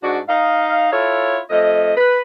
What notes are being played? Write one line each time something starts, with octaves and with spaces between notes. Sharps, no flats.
G#2 D4 F#4
D#4 F5
E4 F4 A4 C#5
F2 A3 D#5
B4